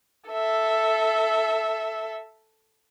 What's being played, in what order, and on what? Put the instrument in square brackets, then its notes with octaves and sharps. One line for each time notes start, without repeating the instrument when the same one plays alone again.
[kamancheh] A4 E5